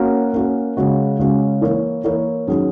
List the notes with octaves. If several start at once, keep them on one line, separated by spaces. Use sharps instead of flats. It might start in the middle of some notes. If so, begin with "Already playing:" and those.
Already playing: A#3 C#4 F#4 A#4
A#3 C#4 F#4 A#4
C#3 G#3 C#4 F#4
C#3 G#3 C#4 F#4
E3 A#3 E4 A#4 C#5
E3 A#3 E4 A#4 C#5
D#3 F#3 C#4 G#4